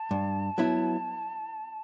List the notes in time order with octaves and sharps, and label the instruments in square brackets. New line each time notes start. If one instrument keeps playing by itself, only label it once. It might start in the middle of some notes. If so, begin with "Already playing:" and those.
Already playing: [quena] A5
[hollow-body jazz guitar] G2
F#3 B3 E4